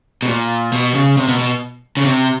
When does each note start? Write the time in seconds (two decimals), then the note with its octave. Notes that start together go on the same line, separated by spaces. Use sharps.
0.22 B2
0.28 A#2
0.73 B2
0.94 C#3
1.17 C3
1.28 B2
1.39 B2
1.97 C#3
2.05 C3